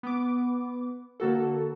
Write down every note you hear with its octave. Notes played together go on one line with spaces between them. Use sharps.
B3 D6
D3 A#3 F#4 A4